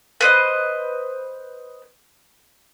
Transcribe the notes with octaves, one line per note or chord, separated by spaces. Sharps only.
B4 C5 D#5